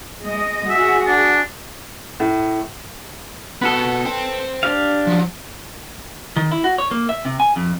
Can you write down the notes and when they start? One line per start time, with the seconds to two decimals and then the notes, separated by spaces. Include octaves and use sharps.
0.25 G#3 D#5
0.70 F#4 G#4 E5
1.07 D4
2.20 A2
3.61 B3 F#4 A4 B4 A5
4.05 C5 G5
4.63 D4 G4 F5
5.07 F3 F#3
6.36 D#3
6.52 E4
6.64 F#4
6.78 C#5
6.91 A#3
7.09 E5
7.25 C3
7.40 G#5
7.56 F2